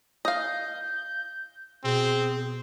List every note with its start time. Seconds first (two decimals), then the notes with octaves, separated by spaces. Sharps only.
0.25 D#5 F5 G6
1.84 B2 C4 G#4